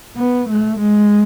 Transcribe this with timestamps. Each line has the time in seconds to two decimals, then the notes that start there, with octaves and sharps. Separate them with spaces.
0.17 B3
0.49 A3
0.80 G#3